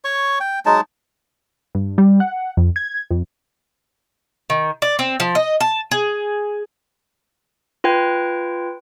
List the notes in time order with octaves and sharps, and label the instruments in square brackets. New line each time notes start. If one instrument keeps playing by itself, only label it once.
[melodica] C#5 C#6
G5
F#3 G#3 D#4 A5
[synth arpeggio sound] G2
G3
F#5
F2
G#6
F2
[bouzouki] D#3
D5
C4
F3
D#5
A5
G#4
[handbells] F4 B4 G5 G#6